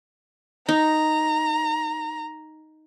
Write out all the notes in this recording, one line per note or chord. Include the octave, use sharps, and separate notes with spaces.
D#4 A#5